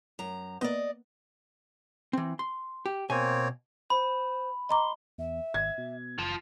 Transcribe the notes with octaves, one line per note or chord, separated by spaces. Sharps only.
F#2 A#5
A#3 B3 B4 D5 D#5
E3 C4
C6
G4
B2 A#3 C4 C#5 G#5
C5 B5
D#5 A#5 C6 D6
E2 E5
G#1 G#6
B2
F#1 F4 A5